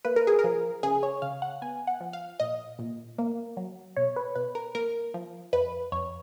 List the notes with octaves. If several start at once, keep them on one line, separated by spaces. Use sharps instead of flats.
A#3 B4
A#4
G#4
A#4
F3
C#3 G#4
C#5
C#3 F5
F#5
B3 G#5
F#5
F3
F5
A#2 D#5
A#2
A#3
F#3
B2 C#5
B4
B2 B4
A#4
A#3 A#4
F3
F2 B4
F2 C#5